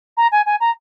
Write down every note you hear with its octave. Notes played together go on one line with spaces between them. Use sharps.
A#5
G#5
G#5
A#5